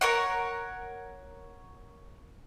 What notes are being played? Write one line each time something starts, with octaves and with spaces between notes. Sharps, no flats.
A#4 C#5 F#5